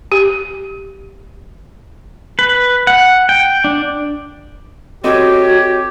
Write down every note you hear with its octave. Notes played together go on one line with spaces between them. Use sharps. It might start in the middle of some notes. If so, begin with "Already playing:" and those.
G4
B4
F#5
G5
D4
C4 F#4 G4 A4 C#5 D#5